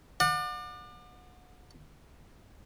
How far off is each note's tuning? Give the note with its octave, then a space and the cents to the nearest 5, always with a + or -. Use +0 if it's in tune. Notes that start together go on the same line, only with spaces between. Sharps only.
D5 +35 F#5 -30